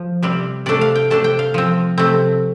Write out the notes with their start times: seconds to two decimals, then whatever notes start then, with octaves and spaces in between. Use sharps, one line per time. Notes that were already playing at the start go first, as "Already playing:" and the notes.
Already playing: F3
0.23 C3 G3 C4
0.66 C3 A3 D4 D5
0.81 F5
0.95 G5
1.10 C3 A3 D4 A5
1.24 G5
1.39 F5
1.54 F3 C4
1.98 C3 A3 C4